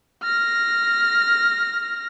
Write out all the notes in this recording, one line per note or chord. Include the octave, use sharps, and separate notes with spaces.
F6 A#6